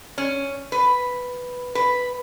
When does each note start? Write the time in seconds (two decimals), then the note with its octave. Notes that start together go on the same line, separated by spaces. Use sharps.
0.18 C#4
0.72 B4
1.75 B4